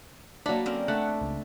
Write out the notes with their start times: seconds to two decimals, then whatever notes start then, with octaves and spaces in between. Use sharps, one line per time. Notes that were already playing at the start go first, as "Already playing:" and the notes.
0.46 F#3 A3 A#3 D4 B5
0.66 D3 C4 C#4 A#4
0.88 A3 D4 D5 F#5
1.21 C#2